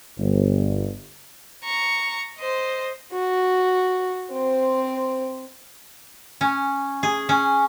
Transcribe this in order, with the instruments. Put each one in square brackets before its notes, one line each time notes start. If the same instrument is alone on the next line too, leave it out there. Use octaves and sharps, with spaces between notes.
[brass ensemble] G1
[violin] A#5 C#6
C5 D#5
[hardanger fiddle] F#4
C4 C5
[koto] C#4
G#4
C#4